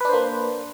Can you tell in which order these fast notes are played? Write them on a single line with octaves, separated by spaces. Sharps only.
B4 D4 C5 A#3